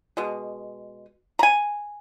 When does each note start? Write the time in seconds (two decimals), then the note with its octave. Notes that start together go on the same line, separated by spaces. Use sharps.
0.17 B2 G#3
1.39 A#5
1.43 G#5